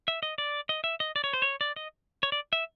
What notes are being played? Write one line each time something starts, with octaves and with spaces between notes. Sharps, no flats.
E5
D#5
D5
D#5
E5
D#5
D5
C#5
C5
C#5
D5
D#5
C#5
D5
E5